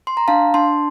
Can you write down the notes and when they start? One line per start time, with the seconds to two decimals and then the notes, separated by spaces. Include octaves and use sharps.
0.07 C6
0.17 A#5
0.28 D4 F5 A5
0.54 D4 A5 C6